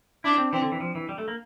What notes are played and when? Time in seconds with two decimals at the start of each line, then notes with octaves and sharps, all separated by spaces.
0.24 D4 E4
0.38 C4
0.53 E3 C4
0.61 D3
0.72 E3
0.80 F3
0.95 E3
1.09 G3
1.18 A3
1.28 A#3